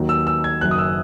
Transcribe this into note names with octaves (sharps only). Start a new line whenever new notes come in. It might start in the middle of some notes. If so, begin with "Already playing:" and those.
Already playing: D#2 D#3 F#3
E6
E6
G#6
F#1 F#2 D#3 F#3 F#6
D#6
E6